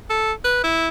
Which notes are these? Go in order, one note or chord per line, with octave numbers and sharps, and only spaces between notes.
A4
B4
E4